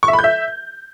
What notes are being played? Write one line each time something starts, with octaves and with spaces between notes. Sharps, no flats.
C#6
E5
B5
G6
E5